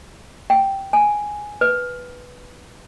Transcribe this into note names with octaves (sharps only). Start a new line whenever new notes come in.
G5
G#5
B4